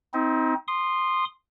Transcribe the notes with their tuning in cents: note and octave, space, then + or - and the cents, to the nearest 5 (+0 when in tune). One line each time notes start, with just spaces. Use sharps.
C4 -10 D#4 +35
C6 +0 D#6 -25